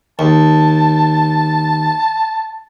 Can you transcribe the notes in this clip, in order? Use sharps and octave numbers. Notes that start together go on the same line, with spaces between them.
D#2 A5